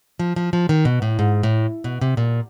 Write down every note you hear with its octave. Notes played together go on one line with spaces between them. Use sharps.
F3
F3
F3
D#3
B2
A2
G#2
A2
B2
C3
A#2